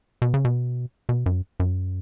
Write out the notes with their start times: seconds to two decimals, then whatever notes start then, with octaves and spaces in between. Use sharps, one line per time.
0.22 B2
0.34 C#3
0.45 B2
1.09 B2
1.26 F#2
1.60 F#2